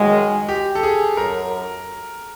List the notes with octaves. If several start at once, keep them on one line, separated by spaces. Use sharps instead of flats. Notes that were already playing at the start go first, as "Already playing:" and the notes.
Already playing: F#2 D#3 G#3 F#4
G4
A4
G#4
F#2 A#4